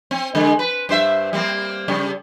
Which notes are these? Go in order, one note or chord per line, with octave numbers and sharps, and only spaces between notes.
C4
D3 G#3
B4
G2 C5 E5
G3 A#3 C4
C#3 G3